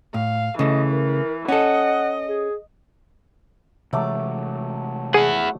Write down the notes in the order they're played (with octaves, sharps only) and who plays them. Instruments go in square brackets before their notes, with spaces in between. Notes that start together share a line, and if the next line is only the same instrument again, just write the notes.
[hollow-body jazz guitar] A2 [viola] F5
[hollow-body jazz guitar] C#3 A3 [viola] E3 [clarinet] D#5
[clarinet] A#4
[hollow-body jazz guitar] C#4 A4 [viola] D#5 [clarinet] F#5
[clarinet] G#4
[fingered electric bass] C3 E3 G#3 [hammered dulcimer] F#3 A3 D6
[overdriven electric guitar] E4 F#5 [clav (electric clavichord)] G#4